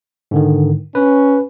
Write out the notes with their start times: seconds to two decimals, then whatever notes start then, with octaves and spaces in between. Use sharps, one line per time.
0.31 G#2 D3 D#3
0.95 C#4 B4